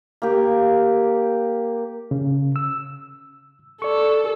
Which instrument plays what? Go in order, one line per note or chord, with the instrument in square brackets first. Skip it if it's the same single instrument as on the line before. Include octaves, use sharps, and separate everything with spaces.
[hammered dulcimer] A#3 G4
[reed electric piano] C#3
E6
[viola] A4 [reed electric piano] D5 C#6